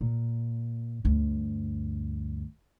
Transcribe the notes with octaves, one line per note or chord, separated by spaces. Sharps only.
A#2
D2 G2